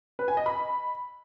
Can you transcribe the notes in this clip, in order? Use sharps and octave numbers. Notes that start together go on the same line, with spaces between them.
B4
G#5
D#5
B5